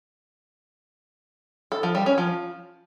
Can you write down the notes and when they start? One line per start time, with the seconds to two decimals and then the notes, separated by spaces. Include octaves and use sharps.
1.72 A4
1.83 F3
1.95 G3
2.06 C#4
2.18 F3